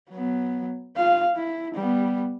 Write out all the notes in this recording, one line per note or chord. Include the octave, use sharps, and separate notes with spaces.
F#3 B3
F4 F5
E4
G3 B3